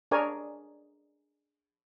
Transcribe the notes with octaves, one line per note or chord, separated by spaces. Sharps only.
D4 G#4 A#4 C#5 D5 G#5